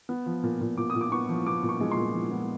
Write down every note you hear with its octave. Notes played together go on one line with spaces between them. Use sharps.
B3
F3
A#2
A#2
A#2 D6
D#6
A#2
D6
B3 C#6
F3
B3 D6
A#2
C#6
G#3
C6
A#2
F3
B3